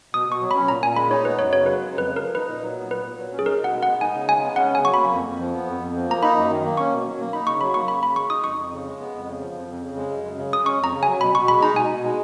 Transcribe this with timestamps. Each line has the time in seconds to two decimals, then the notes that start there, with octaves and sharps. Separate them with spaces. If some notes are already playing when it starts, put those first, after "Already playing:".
0.13 B2 D#6
0.28 B2 C#6
0.41 F#3
0.51 C#4 B5
0.68 A#2 A#5
0.83 A#2 G#5
0.96 G#3 B5
1.10 D#4 C#5
1.25 B3 B4
1.38 F#2 C#5
1.52 C#3 C#5
1.65 F#3 B4
1.80 G#3
1.94 F2 B4
2.07 C#3
2.16 F3 A#4
2.35 D#4 B4
2.48 A#2
2.62 F#3
2.77 B3
2.90 A#2 B4
3.04 A#2
3.18 F#3
3.32 C#4
3.39 G#4
3.46 D#4 A#4
3.60 B2 F#5
3.73 G#3
3.83 B3 F#5
4.01 D#4 G#5
4.14 C#3
4.29 G#3 G#5
4.43 B3
4.56 C#4 F#5
4.70 C#3
4.75 G#5
4.84 F#3 C#6
4.94 A#3 B5
5.12 F2
5.25 F2
5.39 F3
5.54 B3
5.67 F2
5.81 F2
5.95 F3
6.08 A#3 A#5
6.23 D#4 B5
6.36 F#2
6.50 D#3
6.64 A#3
6.77 C#4 C#6
6.92 B2
7.06 F#3
7.20 A#3
7.33 D#4 B5
7.47 C#3 C#6
7.61 F#3 B5
7.74 A#3 C#6
7.88 C#3 B5
8.03 C#3 B5
8.16 G#3 C#6
8.30 D#4 D#6
8.44 F2 C#6
8.57 F2
8.72 C#3
8.86 G#3
9.00 B3
9.14 F2
9.27 C#3
9.41 F3
9.54 F2
9.69 F2
9.82 C#3
9.97 G#3
10.10 F#2
10.23 F#2
10.38 C#3
10.52 G#3 D#6
10.66 C#4 C#6
10.79 F2 A#5
10.93 C#3
11.03 F#3 G#5
11.20 B2 B5
11.35 B2 C#6
11.48 G#3 B5
11.62 D#4 A#5
11.76 B2 G#5
11.90 B2
12.03 G#3